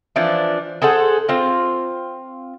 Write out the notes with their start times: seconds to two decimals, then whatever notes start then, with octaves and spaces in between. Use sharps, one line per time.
0.16 E3 F3 D4
0.82 G#4 A4 C5 F#5
1.29 C4 F4